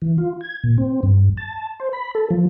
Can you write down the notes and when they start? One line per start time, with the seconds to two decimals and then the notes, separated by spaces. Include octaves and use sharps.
0.02 E3
0.18 F4
0.41 G#6
0.64 A#2
0.78 C4
1.03 G2
1.37 A5
1.80 C5
1.93 B5
2.15 A4
2.31 F3